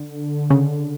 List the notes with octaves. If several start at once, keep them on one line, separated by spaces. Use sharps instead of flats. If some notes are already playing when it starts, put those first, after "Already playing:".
Already playing: D3
C#3